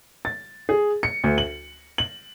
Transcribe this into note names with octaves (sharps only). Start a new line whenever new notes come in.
A6
G#4
C#7
D2
F#7
F#7